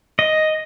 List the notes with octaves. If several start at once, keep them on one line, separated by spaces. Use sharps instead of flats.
D#5